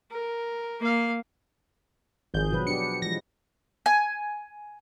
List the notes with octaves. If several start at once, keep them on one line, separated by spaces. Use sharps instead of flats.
A#4
A#3 F5
G#1 F3 G#4 G6
B2 F#3 B4
D4 G4 C#7
E3 F3 G#3 A#6
G#5